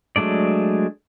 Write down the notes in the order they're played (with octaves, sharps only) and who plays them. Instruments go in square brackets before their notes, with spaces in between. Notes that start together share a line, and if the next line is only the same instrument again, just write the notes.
[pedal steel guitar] F#3 G#3 A3 D4 D5